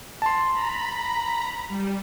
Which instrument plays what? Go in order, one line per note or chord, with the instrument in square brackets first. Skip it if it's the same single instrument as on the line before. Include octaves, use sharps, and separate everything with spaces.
[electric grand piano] A5 C6
[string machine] A#5 B5
G3